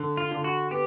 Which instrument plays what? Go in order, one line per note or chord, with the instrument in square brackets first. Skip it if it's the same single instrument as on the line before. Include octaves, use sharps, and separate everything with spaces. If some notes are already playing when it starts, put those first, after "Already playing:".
Already playing: [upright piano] D3
[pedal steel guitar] F4
[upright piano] D3
[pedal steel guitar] F#4
[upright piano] B3 [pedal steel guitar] G4